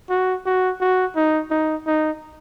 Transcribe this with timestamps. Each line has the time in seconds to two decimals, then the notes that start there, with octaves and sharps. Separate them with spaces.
0.10 F#4
0.46 F#4
0.81 F#4
1.16 D#4
1.51 D#4
1.87 D#4